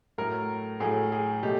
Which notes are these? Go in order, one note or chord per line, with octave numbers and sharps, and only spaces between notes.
A2 F#3 A3 A#4
A2 F#3 A3 G#4
G#4
B2 F#3 A3 G4